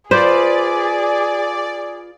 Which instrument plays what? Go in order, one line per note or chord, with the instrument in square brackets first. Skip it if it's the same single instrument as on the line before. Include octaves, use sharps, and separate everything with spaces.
[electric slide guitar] F4 B4 [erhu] G#4 [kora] C5 [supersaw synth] D5